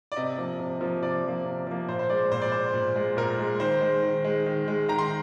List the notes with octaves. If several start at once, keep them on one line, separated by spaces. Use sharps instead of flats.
D5
C3 D#5
F3 A#3
C3
F3 A#3
C3 D5
F3 A#3
C3
F3 A#3
A#2 C5
C5
G#3 D5
A#2 C5
D5
G#3 C5
A#2
G#3
A#2 A#4
G#3
D#3 C5
G#3
D#3
G#3
D#3
G#3
D#3 A#5
C6